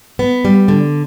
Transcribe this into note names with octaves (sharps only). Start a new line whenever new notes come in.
B3
G3
D3